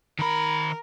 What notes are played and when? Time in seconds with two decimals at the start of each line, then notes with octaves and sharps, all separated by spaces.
0.19 D#3 A#4 B5